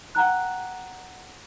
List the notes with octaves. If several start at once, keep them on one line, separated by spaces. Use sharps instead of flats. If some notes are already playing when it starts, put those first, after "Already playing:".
F#5 G5 A#5 F#6